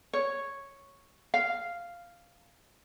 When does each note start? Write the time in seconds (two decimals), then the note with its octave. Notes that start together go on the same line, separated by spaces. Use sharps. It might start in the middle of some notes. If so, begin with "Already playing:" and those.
0.13 C#5
1.34 F5